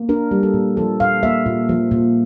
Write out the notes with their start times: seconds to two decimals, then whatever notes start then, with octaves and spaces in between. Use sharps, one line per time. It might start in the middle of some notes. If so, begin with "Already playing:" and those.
Already playing: A#3
0.09 D4 A#4
0.31 G3
0.43 A4
0.54 A#2
0.77 F3 A4
1.00 A#2 F5
1.23 A#3 E5
1.46 A#2
1.69 F3
1.91 A#2